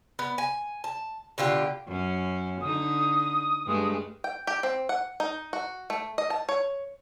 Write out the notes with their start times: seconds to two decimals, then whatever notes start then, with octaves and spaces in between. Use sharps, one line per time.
0.19 B3
0.38 G#5
0.84 A5
1.38 B2 D3 F4 G4
1.88 F#2 C#4
2.61 D3 D#4 D#6
3.66 G2 G#3 A3
4.24 G5
4.47 G4
4.63 C4
4.89 F#5
5.20 D#4
5.53 F#4
5.90 A3
6.18 D#5
6.30 A5
6.49 C#5